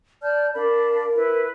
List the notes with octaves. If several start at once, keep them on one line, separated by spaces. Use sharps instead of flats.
D5 A5 F6 G6
D4 A#4 F5 B5
E4 B4